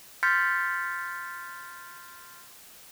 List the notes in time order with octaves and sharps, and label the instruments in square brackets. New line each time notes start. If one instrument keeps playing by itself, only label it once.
[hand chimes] C6 F6 G6 A6 B6 C#7